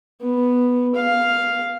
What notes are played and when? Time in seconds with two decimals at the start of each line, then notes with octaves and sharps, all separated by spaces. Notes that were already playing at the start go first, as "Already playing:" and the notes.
0.22 B3
0.95 F5